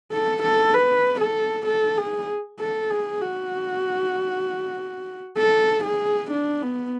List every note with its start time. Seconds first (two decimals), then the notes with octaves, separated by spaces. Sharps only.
0.12 A4
0.43 A4
0.74 B4
1.20 A4
1.67 A4
1.98 G#4
2.60 A4
2.90 G#4
3.21 F#4
5.38 A4
5.85 G#4
6.31 D4
6.62 B3